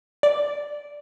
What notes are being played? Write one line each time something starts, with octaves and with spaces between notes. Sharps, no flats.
D5